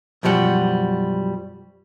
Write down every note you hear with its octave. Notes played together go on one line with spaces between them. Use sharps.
F#2 B2 F3 G3 F#5